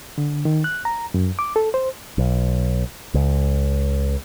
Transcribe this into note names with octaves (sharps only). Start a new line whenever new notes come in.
D3
D#3
F#6
A#5
F#2
D6
A4
C5
B1
C#2